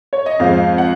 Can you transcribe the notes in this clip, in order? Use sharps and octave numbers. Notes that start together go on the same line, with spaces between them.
C#5
D#5
F2 F3 G#3 F5
F#5